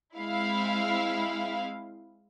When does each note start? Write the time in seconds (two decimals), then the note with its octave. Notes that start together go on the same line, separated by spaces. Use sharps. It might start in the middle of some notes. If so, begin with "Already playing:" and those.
0.15 G#3 C4 E4 F5